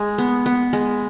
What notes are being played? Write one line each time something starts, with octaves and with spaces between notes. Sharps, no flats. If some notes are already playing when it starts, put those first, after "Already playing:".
Already playing: G#3
B3
B3
G#3